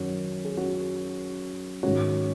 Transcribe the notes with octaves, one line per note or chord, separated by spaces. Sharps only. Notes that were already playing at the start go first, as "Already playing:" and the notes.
Already playing: F#2 D#3 C#4 F#4
G#4
C#4 F#4
G#2 D#3 C#4 F#4